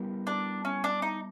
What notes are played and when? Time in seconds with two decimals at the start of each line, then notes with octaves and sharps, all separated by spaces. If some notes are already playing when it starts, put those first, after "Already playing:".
Already playing: G3 B3 E4 G4 A#4
0.27 D4
0.65 C#4
0.84 D4
1.02 D#4